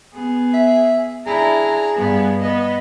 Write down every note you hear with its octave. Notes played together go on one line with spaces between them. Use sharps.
B3 G#4
E5
D4 E4 G#4 A#5
G2 B3
B3 D#5